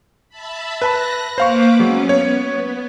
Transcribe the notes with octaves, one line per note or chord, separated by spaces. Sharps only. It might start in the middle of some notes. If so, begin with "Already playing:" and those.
E5 A5 B5
B4 A5 B5 F#6 A#6
A#3 B4 C5 F5 C#6 D6
F#3 G#3 B3 C#4
B3 C#5